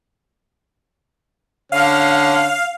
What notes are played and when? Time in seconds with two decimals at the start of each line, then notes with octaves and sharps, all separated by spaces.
1.72 D3 C#4 F5